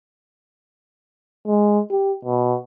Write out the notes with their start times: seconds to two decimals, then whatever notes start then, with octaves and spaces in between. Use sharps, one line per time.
1.47 G#3
1.91 G4
2.25 B2